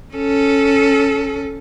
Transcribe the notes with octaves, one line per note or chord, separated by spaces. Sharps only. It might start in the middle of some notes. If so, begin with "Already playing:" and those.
C#4 A4